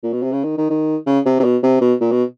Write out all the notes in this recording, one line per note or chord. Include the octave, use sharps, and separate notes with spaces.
A#2
B2
C3
C#3
D#3
D#3
D#3
C#3
C3
C3
B2
C3
B2
A#2
B2